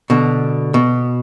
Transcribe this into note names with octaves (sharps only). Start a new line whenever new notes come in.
B2 D3
B2